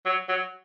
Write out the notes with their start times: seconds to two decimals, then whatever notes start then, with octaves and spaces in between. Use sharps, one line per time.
0.06 F#3
0.29 F#3